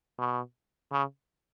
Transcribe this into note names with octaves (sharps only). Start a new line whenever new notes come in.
B2
C#3